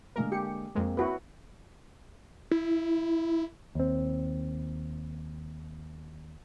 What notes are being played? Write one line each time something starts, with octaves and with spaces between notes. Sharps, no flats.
D3 G#3 A#3 A#4
G4 C#7
F2 G#3 A#3 C4
E4 F#4 B4
E4
D#2 C4